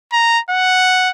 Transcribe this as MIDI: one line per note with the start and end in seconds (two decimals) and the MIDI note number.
0.13 0.40 82
0.50 1.11 78